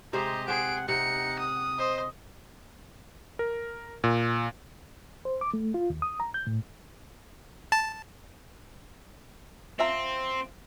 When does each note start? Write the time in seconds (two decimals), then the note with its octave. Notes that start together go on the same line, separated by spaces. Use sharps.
0.13 C3 G#3 G4 C5 D#5 A#5
0.48 G#4 C5 F#5 D7
0.89 C3 D#4 F#5 C#7
1.39 D#6
1.78 C5 D#5
3.39 A#4
4.04 A#2
5.25 C5
5.41 D6
5.54 A3
5.74 F4
5.90 D#2
6.02 D#6
6.20 A#5
6.34 G6
6.47 A2
7.72 A5
9.79 F3 C4 E5 A#5